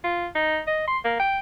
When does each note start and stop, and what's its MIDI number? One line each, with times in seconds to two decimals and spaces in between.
0.04 0.27 65
0.35 0.60 63
0.67 0.85 75
0.88 0.98 84
1.04 1.19 58
1.20 1.39 79